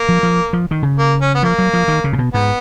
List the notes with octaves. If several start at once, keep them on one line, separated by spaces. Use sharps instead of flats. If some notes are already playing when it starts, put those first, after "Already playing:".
Already playing: A#3
F3
F3
F3
D#3
C#3
A#3
C#4
B3
F3 A#3
F#3
F3
D#3
C#3
A#2
B2
G#2 B3